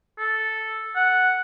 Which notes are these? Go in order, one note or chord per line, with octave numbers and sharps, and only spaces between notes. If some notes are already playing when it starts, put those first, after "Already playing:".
A4
F#5